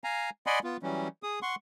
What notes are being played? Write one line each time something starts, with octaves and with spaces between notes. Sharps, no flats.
F5 G#5 A#5
D5 D#5 F#5 G#5 B5 C6
B3 F4
E3 F#3 G3 C#4
G#4 D#6
F#5 C6 C#6